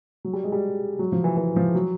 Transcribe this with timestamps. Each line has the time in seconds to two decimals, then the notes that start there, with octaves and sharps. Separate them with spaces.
0.25 F#3
0.33 G3
0.44 G#3
0.52 G3
0.99 F#3
1.12 F3
1.24 E3
1.37 E3
1.56 F3
1.75 F#3